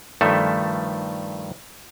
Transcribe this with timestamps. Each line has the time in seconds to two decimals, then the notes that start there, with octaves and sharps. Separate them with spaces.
0.21 G2 D#3 F3 A3 A4 E5